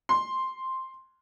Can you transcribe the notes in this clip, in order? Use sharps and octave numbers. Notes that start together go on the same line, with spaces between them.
C6